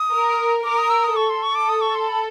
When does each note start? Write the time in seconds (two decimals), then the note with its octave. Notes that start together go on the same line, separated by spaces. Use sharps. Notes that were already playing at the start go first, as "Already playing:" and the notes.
Already playing: D#6
0.13 A#4
0.64 A#4 D6
0.78 D#6
0.90 E6
1.04 D#6
1.16 A4 C#6
1.30 C6
1.43 C#6
1.55 D6
1.69 D#6
1.81 C#6
1.95 C6
2.08 B5